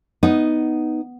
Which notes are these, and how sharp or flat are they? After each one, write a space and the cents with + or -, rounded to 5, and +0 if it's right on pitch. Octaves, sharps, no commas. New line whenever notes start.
B3 +5 D#4 +0